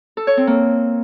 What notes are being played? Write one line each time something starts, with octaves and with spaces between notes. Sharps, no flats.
A4
C#5
C4
A#3